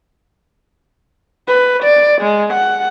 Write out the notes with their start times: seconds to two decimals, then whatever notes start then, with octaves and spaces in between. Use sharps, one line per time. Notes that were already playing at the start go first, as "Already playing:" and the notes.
1.48 B4
1.83 D5
2.21 G#3
2.53 F#5